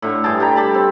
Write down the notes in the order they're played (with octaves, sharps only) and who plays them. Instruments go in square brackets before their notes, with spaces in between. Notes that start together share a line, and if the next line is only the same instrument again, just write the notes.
[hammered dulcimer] A2 D3 C#6
G2 G#4 G5 A5
G3 G5 A#5
G4 A5 B5
C4